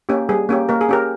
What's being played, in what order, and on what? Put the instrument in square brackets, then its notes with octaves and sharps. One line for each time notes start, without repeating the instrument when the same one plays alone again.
[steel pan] A#3 C#4 G4
G3 G#4
A#3 C#4 G4
A#3 A#4
G#4
C#4 G4 A#4